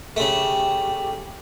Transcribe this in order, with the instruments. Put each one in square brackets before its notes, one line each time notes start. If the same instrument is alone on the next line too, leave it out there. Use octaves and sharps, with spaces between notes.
[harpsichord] C#3 A3 [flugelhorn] G4